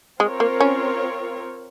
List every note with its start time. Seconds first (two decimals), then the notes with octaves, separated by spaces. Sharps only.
0.20 G#3 C4 F4 A#4 C#5
0.40 A#3
0.60 C#4